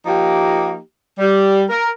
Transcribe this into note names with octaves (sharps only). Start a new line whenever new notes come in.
F3 A#3 D#4 G4
G3
A#4